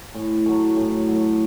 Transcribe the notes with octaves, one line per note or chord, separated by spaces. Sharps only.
A2
F#3 A3
A2
F#3 A3